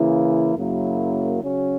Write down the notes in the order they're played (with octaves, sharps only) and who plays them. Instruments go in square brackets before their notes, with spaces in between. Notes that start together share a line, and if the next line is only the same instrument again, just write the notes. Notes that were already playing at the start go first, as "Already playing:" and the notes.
Already playing: [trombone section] C#3 E3 A#3 E4
F#2 C#3 F#3 A#3 E4
C#3 F#3 C#4 F#4